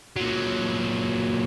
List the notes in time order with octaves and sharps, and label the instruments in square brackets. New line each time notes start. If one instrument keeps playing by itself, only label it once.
[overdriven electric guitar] A#2 F#3